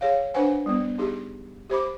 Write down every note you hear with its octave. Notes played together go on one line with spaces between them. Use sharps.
G#4 C#5 F5
D4 B4 C5 F#5 G#5
G3 B3
D#4 G4 G#4
G4 C5 B5 D6